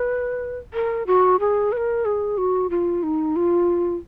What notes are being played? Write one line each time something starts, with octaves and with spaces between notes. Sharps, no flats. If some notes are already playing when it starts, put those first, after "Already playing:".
Already playing: B4
A#4
F#4
G#4
B4
A#4
G#4
F#4
F4
D#4
F4